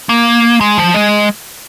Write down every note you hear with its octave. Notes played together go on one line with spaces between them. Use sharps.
A#3
G#3
F3
G#3